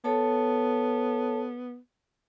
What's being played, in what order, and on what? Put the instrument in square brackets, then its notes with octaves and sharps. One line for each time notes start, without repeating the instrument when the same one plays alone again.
[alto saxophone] B3 [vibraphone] A4 C#5 A5